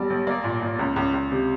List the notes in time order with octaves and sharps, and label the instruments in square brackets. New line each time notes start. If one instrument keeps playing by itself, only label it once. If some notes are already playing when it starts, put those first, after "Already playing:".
Already playing: [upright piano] B1 G3 D5
B1
A#3 D5
A#2
A#2
C#2
C#2
C#2
C3